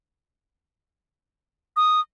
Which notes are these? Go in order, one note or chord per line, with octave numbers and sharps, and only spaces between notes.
D#6